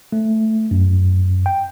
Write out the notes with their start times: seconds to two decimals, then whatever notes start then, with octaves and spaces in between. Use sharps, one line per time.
0.12 A3
0.71 F#2
1.46 G5